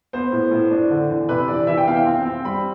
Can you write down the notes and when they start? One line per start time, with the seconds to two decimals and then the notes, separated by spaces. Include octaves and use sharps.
0.13 B3 C5
0.32 A2
0.51 A2
0.70 D4
0.90 D3
1.10 E2
1.28 C3 B4
1.48 E3 D5
1.67 E3 E5
1.77 G5
1.86 B3 F5
1.96 G5
2.06 C4
2.25 C4
2.44 G3 B5